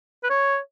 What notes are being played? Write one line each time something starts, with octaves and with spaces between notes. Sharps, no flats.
B4
C#5